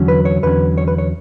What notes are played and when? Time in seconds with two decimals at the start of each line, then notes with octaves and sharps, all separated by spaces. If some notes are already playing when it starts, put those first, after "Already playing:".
Already playing: E2 D3 F#3 C#4
0.08 B4
0.25 C#5
0.43 E2 D3 F#3 C#4 B4
0.78 C#5
0.88 B4
0.98 C#5